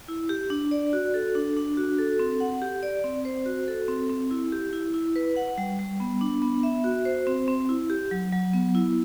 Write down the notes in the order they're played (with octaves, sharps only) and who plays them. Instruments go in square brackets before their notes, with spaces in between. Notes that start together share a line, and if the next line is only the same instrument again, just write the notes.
[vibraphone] E4
G4
D4
D5
F#4
A4
D4
D4
F#4
A4
C4
F#5
G4
D5
C4
C5
F#4
A4
C4
C4
E4
G4
E4
E4
B4
F#5
G3
G3
B3
D4
B3
E5
F#4
C5
C4
C4
E4
G4
F#3
F#3
B3
E4